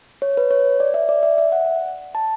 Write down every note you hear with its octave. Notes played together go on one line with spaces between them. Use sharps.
C#5
B4
C#5
D5
E5
D5
E5
E5
F#5
A5